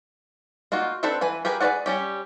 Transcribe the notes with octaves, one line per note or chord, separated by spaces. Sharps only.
A#3 D#4 F4 F#4
C4 D4 A4 B4 C5
E3 B4 G#5
G4 G#4 A#4 B4 G#5
G#4 B4 C#5 D5 F#5
G3 C#4 G4